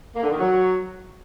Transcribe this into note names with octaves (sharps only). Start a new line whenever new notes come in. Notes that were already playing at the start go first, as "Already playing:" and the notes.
A#3
D3
D#3
F#3